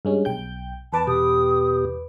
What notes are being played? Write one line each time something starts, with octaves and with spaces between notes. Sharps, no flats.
G2 G#3 C#4
B1 G5 G6
E2 B4 A5 D6
B2 G4 D#6